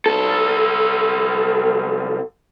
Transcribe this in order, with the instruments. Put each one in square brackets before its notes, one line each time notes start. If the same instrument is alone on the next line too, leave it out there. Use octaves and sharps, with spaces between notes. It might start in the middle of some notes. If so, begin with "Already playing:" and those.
[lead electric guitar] C2 A4